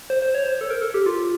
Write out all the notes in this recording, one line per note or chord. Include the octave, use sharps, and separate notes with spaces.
C5
C5
C#5
C5
A4
A#4
A4
G4
F4